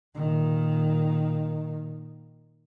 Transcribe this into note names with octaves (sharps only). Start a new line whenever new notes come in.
A#2 D#3